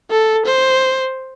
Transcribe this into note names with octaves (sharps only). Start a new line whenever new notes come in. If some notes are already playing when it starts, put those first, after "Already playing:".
A4
C5